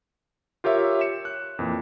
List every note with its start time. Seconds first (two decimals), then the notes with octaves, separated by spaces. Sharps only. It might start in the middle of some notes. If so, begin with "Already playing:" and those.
0.64 F4 G4 A#4 C#5 E5
1.01 C#7 E7
1.25 F#6
1.59 F2 A#2 E3